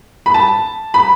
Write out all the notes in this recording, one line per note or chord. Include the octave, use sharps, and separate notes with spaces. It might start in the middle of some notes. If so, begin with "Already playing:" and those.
B5
A5
B5